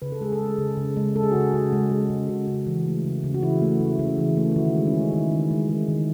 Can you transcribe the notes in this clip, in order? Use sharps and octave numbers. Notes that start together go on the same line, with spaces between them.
C#3 B4
A4
G#3 G#4
A4
G#3
C#3
C#3
G#3
G#3 A4
G#4
C#3 F#4
G#4
C#3
G#3
G#3
C#3
C#3 F#4
C#3
E3
A3
C#3
C#3
F#4
E3 E4
A3
C#3
C#3
E3
A3
E4
D#3 F#4
G#3
C#4
G#3
D#4
D#3 E4
D#3
G#3
G#3
D#3